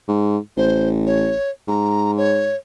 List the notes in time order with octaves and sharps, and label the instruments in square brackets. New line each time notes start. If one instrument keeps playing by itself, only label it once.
[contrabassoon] G#2
[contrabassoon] A1 [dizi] C5
[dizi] C#5
[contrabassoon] G#2 [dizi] A#5
[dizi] C#5